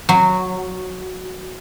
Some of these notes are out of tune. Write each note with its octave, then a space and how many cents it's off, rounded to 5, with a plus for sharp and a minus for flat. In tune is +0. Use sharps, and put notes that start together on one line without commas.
F#3 -5